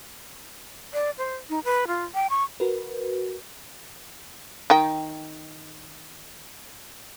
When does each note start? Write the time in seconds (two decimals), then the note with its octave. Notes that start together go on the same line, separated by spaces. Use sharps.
0.94 D5
1.18 C5
1.49 D#4
1.64 B4
1.88 F4
2.15 G5
2.30 C#6
2.60 F#4 A#4 B4
4.70 D#3 G5